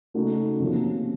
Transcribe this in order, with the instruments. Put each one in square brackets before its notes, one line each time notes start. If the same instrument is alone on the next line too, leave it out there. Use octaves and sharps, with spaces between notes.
[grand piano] C#3 A3 D#4 F#4
C3 F3 A#3 C#4